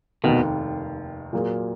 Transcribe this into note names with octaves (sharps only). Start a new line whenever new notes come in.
F1 D#2 B2 D#3
A#2 F#3 A#3 F4 G#4